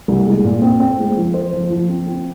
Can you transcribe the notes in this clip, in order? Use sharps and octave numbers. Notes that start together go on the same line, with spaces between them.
C2
G#3
A#2
C4
C4
G#3
F3
C5
F3
F3
C4
C4